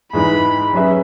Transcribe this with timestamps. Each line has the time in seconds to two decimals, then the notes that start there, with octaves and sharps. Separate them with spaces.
0.13 G#2 E3 G#3 D#4 B5
0.73 F#3 C#4 G#4 B4 E5